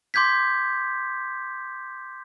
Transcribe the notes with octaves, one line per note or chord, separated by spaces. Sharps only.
C6 D6 G6 G#6 B6